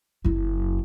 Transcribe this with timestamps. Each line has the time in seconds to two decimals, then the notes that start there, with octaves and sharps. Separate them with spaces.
0.25 F#1 E4